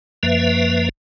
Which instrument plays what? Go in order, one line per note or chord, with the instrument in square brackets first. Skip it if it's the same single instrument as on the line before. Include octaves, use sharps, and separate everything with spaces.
[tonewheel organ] F#2 F3 A#3 B4 E5